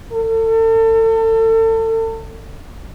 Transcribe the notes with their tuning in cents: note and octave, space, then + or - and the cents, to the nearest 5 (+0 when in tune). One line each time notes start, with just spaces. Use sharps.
A4 +35